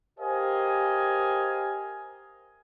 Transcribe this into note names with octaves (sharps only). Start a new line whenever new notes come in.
G4 A#4 C5 D#5 F5 G#5